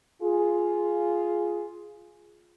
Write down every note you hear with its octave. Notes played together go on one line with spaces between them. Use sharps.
F4 G#4